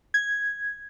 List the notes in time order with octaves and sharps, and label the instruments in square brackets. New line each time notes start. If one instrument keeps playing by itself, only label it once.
[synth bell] G#6